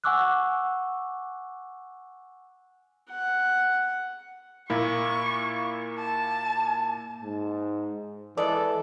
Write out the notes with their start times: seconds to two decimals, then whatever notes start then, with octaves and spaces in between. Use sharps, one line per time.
0.04 F#5 G#5 C#6 D6 E6 F#6
3.10 F#5
4.70 A#2 A#3 E4 C#6
5.99 A5
7.22 G#2
8.37 E3 G#3 A4 D5